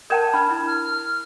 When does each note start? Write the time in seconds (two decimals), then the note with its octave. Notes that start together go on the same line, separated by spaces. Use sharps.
0.10 A#4 G5 A5 G6 G#6 E7
0.34 D4 B5 F6 G#6
0.51 E4
0.67 F6